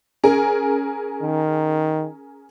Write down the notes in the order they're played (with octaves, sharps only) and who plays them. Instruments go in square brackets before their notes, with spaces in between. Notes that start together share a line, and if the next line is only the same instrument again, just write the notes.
[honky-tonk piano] C#4 G#4 A#4
[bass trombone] D#3